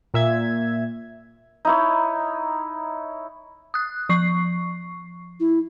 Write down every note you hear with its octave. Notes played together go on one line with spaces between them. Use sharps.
A#2 E5 G#6
D#4 E4 C#5
D#6 F#6
F3 C#6 C7
E4